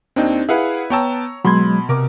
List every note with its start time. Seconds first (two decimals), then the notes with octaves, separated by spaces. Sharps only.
0.16 D#2 C4 D4 D#4
0.49 E4 G#4 B4 F5 F#5
0.90 B3 C#5 G5 A5 A#5 E6
1.45 B2 F#3 G#3 B5 C6 G#6
1.89 C3 A#4 D6